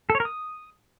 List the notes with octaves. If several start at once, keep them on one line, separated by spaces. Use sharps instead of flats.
A4
C#5
A#4
D#6